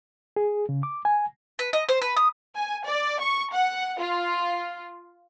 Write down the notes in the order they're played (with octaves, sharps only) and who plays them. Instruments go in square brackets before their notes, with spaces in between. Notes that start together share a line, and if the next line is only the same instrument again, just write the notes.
[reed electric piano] G#4
C#3
D6
G#5
[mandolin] B4
D#5
C5
B4
D#6
[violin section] G#5
D5
C#6
F#5
F4